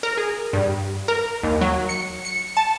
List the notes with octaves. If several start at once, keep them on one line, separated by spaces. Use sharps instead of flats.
A#4
G#4
G2
A#4
D#2
F#3
C#7
C#7
A5